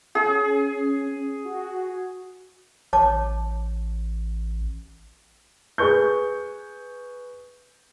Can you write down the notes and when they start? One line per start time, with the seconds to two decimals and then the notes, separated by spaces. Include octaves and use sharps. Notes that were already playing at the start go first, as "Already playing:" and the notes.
0.15 C#4 G#4
1.45 F#4
2.93 A1 C#5 A5 D6
5.78 G#4 B4 C#6 G6